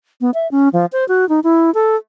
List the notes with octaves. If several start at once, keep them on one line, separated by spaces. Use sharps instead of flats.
B3
E5
C#4
F3
C5
F#4
D#4
E4
A4